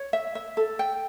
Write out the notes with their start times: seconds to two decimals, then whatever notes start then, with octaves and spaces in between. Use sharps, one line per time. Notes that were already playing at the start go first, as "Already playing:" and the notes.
Already playing: C#5
0.13 E5
0.35 E5
0.57 A4
0.79 G5